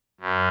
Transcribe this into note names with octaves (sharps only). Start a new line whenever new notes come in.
F#2